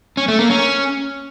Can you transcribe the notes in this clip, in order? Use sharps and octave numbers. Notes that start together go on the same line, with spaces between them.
C#4
A3
A#3
C#4